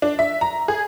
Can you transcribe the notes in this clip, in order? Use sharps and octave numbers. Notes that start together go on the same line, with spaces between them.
D4
E5
A#5
G#4